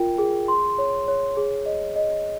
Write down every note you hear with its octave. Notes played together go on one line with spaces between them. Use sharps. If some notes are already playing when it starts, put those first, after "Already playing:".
Already playing: F4 A#4 G5
G#4
C6
C#5
C#5
G#4
D#5
D#5